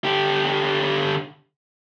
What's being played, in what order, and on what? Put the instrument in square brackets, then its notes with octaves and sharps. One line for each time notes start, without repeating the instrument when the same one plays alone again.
[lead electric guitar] D3 G4